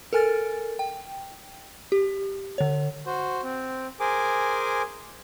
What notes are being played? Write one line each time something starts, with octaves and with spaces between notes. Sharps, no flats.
A4 A#4 G#5 F6 A6
G5
G4
D3 C#5
F#4 C5
C4
G#4 A#4 C5 G#5 D6